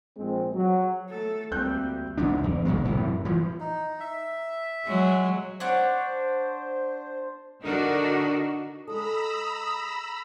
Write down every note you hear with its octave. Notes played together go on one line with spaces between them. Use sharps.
A#1 G#3 C4
F#3
A3 A4
D2 G3 A#3 C4 F#6 G6
C#2 G#2 C3 D4
E2
F#2 B2 D#3 G#3
F#2 A2 C3 E3
E3 F3
D#4
E5
F#3 G#3
D4 C5 C#5 F#5
D3 D4 D#4 F#4 A#4
G#3 A4 A#5 B5 D#6 E6